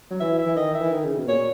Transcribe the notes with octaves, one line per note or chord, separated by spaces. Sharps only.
F#3
E3 E5
E5
E3
D#3 D#5
E5
E3
D#3
C#3
B2
A#2 C#5
A#2